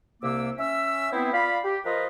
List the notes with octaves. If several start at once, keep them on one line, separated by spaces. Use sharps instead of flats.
C2 C3 A#3 D6 E6
C#4 E5 E6
B3 C4 E4
F4 D5 F5 B5
G4
F3 F4 A#4 B4 D#5